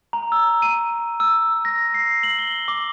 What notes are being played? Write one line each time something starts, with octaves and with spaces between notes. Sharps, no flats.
A#5
E6
D#7
E6
A#6
C7
F#7
G7
D6